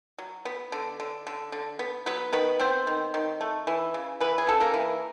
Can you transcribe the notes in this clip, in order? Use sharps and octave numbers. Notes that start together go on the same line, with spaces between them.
F#3
B3
D3
D3
D3
D3
B3
F#3 B3 B4
D#3 B3 B4
B3 C4 C5
D#3
D#3
A3
E3
C#3
E3 B3 B4
G#4
C#3 A4
A#3 A#4
E3